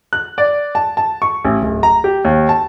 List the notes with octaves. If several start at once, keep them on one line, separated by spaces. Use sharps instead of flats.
F#6
D5
A5
A5
C#6
A1
D1
A#5
G4
D#2
A5